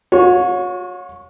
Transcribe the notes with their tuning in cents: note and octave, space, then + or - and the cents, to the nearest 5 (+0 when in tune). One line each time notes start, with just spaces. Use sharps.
F#4 -45 C#5 +0